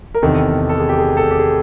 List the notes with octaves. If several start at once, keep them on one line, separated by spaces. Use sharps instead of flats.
A#4
E2 C3 D#3 A4
A4
G#4
G4
G#4
A4
G4
G#4